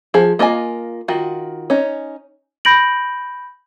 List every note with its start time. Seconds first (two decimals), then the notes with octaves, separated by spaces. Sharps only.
0.14 F3 G#4
0.39 A#3 F4 D#5 G#5
1.08 D#3 F4 F#4
1.70 C#4 D#4
2.65 B5 G6 A#6 D7 F#7